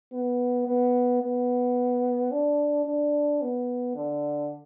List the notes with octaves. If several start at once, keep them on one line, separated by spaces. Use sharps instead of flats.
B3
B3
B3
D4
D4
B3
D3